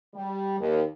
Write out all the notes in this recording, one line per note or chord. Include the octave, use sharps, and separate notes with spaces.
G3
D#2